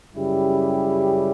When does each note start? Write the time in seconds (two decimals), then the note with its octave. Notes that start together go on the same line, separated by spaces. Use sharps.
0.14 F#2 C#3 G3 E4 G4